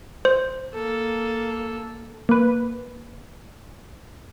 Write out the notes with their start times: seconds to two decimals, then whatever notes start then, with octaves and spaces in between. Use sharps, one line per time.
0.25 C5
0.75 A#3 A4
2.29 A#3 B4